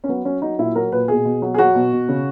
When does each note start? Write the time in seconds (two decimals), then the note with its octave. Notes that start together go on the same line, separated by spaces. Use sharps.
0.04 C#4
0.08 F#3 B3
0.25 F#3 C#4
0.42 F#3 D#4
0.58 A#2 E4
0.75 F#3 A#4
0.92 A#2 B4
1.08 B2 G#4
1.25 B2
1.42 F#3
1.54 G#4
1.58 F#3 F#4
1.75 B2
1.92 B2
2.09 C#3